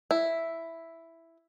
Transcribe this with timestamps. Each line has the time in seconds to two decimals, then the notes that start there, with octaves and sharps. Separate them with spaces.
0.11 E4